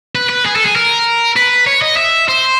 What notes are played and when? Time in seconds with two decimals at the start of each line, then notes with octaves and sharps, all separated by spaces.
0.15 B4
0.29 B4
0.45 G#4
0.56 A4
0.65 G#4
0.76 A#4
1.37 B4
1.67 C#5
1.82 D#5
1.97 E5
2.28 C5